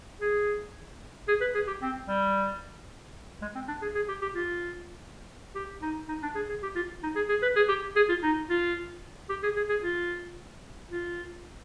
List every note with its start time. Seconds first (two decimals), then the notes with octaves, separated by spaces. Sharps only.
0.21 G#4
1.28 G#4
1.41 B4
1.54 G#4
1.67 G4
1.82 C4
2.08 G3
3.42 G#3
3.55 C4
3.68 D4
3.82 G#4
3.95 G#4
4.09 G4
4.22 G4
4.35 F4
5.55 G4
5.82 D#4
6.09 D#4
6.23 D4
6.35 G#4
6.49 G#4
6.63 G4
6.76 F4
7.03 D#4
7.16 G#4
7.29 G#4
7.43 B4
7.56 G#4
7.69 G4
7.96 G#4
8.09 F4
8.23 D#4
8.50 F4
9.30 G4
9.43 G#4
9.56 G#4
9.69 G#4
9.83 F4
10.90 F4